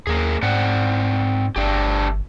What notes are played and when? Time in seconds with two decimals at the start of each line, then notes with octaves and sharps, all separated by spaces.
0.07 D#2 A#3 G#4
0.42 G#2 C4 D5 F#5
1.56 G1 A3 D4 G4